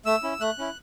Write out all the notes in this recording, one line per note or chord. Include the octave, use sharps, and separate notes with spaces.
A3 E6
C#4 E4
A3 F#6
C#4 E4